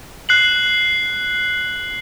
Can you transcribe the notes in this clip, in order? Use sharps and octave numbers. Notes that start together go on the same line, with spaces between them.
F#6 C7 F#7